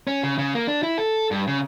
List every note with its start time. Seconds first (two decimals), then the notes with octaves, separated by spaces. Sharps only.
0.07 C#4
0.23 C#3
0.38 C#3
0.55 A#3
0.67 D4
0.83 E4
0.98 A4
1.31 G2
1.47 C#3